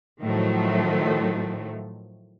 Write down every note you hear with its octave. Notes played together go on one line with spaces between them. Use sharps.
A2 D#3 F3 F#3 A3